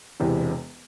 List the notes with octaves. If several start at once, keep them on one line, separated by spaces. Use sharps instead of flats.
E1 E2 C3